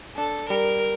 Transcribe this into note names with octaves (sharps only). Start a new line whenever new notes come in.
D4 A4
G3 A#4